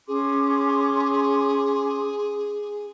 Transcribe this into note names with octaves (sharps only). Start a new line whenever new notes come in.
C#4 G#4 C6 D6